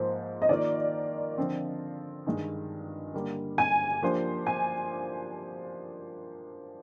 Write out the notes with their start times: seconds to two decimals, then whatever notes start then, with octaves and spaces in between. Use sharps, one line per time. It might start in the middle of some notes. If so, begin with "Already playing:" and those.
Already playing: G#2 F3 A#3 C5
0.42 D#5
0.49 D#3 A#3 F4 A#4 D5
1.37 D3 F3 C4 F4
2.26 G2 D#3 G#3
3.14 D3 G3 A#3
3.58 G#5
4.02 F3 A#3 D4 G4 C5
4.47 G#5